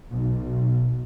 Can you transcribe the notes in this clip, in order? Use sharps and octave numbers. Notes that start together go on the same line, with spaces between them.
B1